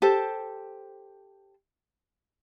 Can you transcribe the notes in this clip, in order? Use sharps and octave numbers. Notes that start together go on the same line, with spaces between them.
G4 A4 C5